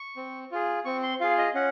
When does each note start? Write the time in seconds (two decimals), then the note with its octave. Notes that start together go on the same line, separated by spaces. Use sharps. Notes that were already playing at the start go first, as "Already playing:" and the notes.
Already playing: C#6
0.17 C4
0.52 F4 G#4
0.85 C4 C#6
1.03 C6
1.20 F4 G#4 F5
1.38 D#5
1.55 C#4 F#5